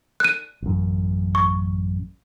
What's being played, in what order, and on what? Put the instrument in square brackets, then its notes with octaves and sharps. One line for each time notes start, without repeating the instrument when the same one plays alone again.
[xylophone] F#6 D#7
[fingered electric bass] A1 F#2
[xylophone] C#6